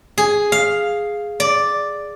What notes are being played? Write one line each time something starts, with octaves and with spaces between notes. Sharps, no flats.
G#4
F5
D5